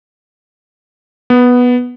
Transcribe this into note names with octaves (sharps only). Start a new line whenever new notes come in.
B3